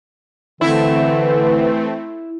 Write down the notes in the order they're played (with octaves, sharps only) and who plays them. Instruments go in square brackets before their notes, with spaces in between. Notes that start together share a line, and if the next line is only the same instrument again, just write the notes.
[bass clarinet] D3 [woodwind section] E3 [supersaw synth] A3 C4 [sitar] E4